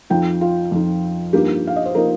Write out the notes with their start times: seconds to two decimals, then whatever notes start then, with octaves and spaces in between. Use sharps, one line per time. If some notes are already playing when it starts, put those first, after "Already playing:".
0.10 F2 F3 D#4 G5
0.41 F4
0.72 F2 F3 D#4
1.33 G2 F3 A#3 D#4 G4
1.67 F5
1.76 D#5
1.85 C5
1.95 F3 A#3 D#4 A#4